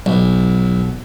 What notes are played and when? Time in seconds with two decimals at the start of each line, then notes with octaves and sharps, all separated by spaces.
0.06 B1